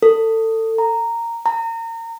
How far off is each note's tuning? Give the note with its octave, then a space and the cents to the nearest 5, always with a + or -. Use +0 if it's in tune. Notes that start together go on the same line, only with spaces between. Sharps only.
A4 +25
A#5 -10
A#5 -30